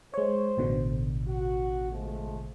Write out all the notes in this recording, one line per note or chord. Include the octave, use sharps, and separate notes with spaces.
G#3 C5 C#5
A1 B2 D3
F#4
F3 G#3 A3